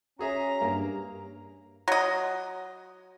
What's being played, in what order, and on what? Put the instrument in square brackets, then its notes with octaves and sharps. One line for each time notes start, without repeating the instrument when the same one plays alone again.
[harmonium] C#4 [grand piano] F#4 G#4 E5 [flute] A#5
[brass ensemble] G2 [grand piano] A#3
[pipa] F#3 D#5